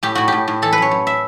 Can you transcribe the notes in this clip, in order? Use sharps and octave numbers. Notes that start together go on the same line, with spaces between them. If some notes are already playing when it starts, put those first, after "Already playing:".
A2 G4
A2 F#4
A2 G4
A2
E3 A4
B4
F#2 C#5
F#2
E5